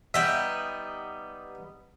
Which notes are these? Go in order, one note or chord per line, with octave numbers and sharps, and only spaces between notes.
G3 B3 D#4 E5